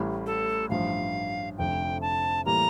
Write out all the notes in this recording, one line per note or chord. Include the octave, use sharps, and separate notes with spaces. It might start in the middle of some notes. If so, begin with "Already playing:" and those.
Already playing: A1 A2 G3
A4
A1 G2 F3 F5
F1 F2 D3 G5
A5
A2 E3 G3 A#3 A#5